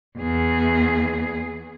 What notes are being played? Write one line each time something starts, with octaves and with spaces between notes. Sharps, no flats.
E2 G#4